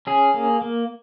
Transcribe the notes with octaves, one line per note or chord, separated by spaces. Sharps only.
C#4 G#4
A#3
A#3